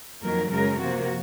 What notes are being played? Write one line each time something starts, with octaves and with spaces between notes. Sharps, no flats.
F2 D#3 F#3 A#3 A#4
F#2 C#3 G#3 A#4
C3 F3 A#3 F#4